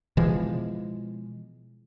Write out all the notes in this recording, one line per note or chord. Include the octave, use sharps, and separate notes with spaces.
B2 E3 F3 G#3